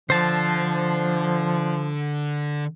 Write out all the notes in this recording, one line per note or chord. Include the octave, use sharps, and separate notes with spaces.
D3 F3 C5 A5